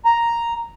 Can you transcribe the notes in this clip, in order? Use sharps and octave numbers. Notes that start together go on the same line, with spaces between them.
A#5